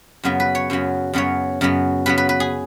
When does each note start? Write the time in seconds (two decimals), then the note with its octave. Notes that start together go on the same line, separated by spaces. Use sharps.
0.24 F#2 C#3 F#3 B3
0.40 B4
0.55 C#5
0.70 F#2 C#3 F#3 B3
1.13 F#2 C#3 F#3 B3 C#5
1.61 F#2 C#3 F#3 B3
2.06 C#3 F#3 B3 B4
2.18 B4
2.29 B4
2.40 G#4